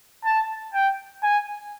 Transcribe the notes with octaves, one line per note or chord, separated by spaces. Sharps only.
A5
G5
G#5